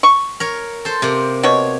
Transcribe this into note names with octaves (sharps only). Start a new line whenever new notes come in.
C#6
A#4 C#5
A4 C5
C3 A#3
B2 C#5